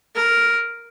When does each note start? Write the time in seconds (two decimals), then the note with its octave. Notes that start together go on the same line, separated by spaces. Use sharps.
0.15 A#4